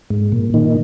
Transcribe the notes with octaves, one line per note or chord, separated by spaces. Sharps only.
G#2
A#2
A#2 D#3